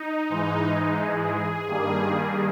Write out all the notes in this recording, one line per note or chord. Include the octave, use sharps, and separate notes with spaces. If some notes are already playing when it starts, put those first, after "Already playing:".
Already playing: D#4
G#2 E3 G#3
G#4
G2 D#3 G3 A#3